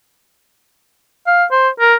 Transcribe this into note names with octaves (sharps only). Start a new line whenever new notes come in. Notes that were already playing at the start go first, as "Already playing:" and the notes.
F5
C5
A#4